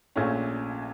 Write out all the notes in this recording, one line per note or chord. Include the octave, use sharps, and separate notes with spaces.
A#1 A#2 A3 C#4